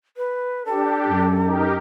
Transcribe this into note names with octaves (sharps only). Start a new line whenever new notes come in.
B4
D4 G4 A4
F#2
D#4 G4 A#4